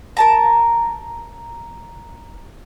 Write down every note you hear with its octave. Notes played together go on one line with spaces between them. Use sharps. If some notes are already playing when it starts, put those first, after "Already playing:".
A#4 A5 A#5